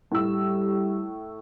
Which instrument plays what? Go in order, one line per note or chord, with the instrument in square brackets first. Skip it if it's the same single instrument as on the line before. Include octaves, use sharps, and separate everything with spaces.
[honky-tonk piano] A2 E6 [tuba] G3